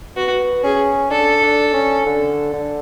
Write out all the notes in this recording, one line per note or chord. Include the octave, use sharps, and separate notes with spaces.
B3 F#4
C#4 G#4
D4 A4
D4
C#4
D3
D3